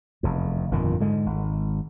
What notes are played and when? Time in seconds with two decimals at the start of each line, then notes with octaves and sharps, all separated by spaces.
0.23 F1 E2
0.71 G1 F2 A#2 D#3
1.00 G#2 D3 G#3
1.26 G#1